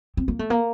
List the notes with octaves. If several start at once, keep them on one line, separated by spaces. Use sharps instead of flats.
C4
A#3
A3
A#3